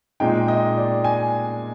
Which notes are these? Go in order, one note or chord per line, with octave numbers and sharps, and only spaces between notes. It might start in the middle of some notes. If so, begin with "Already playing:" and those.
A#2 G#3 C4 D#4 G5
D#5
D5
G#5